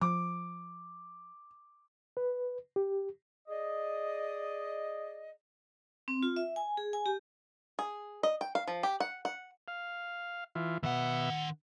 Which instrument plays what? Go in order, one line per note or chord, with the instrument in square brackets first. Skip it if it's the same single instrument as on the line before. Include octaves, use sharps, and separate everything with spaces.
[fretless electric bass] F3 [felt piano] D6
[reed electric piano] B4
G4
[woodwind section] G#4 D5 D#5
[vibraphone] C4
F4
E5
G#5
G#4
G#5
G4
[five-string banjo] G#4
D#5
G5
F5
F3
G4
F#5
F#5
[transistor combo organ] F5
E3 F4
[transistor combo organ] B2 E5 [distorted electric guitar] D#3 F#5